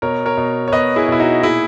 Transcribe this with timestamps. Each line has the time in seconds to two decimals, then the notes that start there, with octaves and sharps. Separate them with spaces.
0.02 B2 A#4 C#5
0.26 A#4 C#5
0.37 B2
0.68 C#5
0.72 B2 B4 D#5
0.96 E4 G#4
1.08 B2 E4
1.19 D#4 F#4
1.43 A#2 E4 G#4